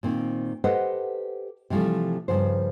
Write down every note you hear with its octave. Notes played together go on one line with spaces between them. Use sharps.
A#2 D#3 C4
G4 A4 B4 C5 D#5 F#5
C3 E3 F3 G3 A3
G2 C#3 F3 C5